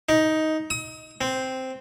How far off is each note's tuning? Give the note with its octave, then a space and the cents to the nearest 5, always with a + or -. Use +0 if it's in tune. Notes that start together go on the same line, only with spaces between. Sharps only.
D#4 +10
D#6 +40
C4 -5